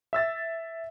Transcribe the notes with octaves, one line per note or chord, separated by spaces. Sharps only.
E5 E6 A6